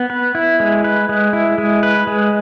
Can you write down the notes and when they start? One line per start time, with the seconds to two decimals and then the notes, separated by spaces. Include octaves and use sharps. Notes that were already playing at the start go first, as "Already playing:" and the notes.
Already playing: B3
0.10 B4
0.35 E4
0.60 G#3
0.84 B4
1.09 G#3
1.33 E4
1.58 G#3
1.83 B4
2.07 G#3